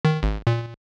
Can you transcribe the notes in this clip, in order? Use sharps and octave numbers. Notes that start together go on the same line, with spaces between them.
D#3
G#1
A#2